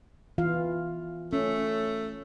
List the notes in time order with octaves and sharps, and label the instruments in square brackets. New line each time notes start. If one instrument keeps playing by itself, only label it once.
[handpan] E3 F4 F5
[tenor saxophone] A3 [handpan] C#4